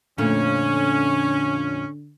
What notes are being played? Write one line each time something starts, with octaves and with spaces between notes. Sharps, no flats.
F2 A#2 D3 A3 C#4